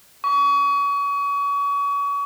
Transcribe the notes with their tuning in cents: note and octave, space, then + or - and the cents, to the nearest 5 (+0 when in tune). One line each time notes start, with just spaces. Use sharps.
C#6 +35